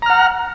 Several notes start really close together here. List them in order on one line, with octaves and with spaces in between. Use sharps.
A#5 F6 F#5